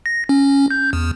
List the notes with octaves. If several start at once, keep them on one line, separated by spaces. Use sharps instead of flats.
A#6
C#4
G6
E2